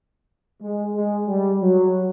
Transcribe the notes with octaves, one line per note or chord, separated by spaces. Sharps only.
G#3
G#3
G3
F#3